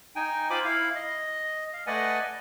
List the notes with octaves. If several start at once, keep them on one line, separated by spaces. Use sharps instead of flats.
D#4 G5 G#5
F4 C5 G#5 B5 D6
E4 F5
D#5
F5
A3 B4 D5 D#5 F#5 G#5